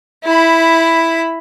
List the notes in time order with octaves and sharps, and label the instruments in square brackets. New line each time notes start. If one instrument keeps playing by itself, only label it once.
[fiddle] E4 B5